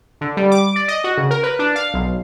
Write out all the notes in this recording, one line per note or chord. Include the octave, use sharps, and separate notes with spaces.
D3
G3
D6
D5
D#5
F#4
C#3
A#4
B4
D4
F5
B1